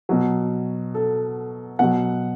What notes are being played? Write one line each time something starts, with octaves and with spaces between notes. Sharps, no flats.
B2 F#3
A4
B2 F#3 F#5